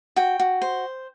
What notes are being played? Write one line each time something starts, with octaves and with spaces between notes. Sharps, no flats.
F#4 G5
F#4
C5